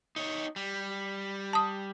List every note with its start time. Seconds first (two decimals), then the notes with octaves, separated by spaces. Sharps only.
0.16 D#4 C#5
0.56 G3
1.53 A5 D#6